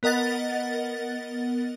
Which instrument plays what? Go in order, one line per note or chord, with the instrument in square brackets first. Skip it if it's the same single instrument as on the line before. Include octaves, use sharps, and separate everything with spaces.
[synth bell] B3 A#4 D#5 F#5 A6